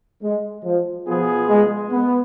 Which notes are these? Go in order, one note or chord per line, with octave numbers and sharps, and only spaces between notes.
G#3
F3
B2 F3 B3 F4 G#4
G#3
B3